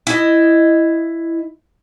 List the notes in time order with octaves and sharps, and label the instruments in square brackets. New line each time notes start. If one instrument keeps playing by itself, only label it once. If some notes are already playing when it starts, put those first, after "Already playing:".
[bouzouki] E4 D#5